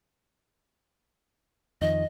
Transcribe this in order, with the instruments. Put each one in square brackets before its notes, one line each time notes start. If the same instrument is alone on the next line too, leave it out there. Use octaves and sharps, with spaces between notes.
[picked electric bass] F2 D#3 [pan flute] D#5